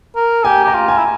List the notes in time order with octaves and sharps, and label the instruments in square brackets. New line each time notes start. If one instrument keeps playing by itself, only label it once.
[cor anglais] A#4
[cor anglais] G4 [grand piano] G#5
[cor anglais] G4 [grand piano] A#5
[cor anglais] F4
[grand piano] G#5
[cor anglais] E4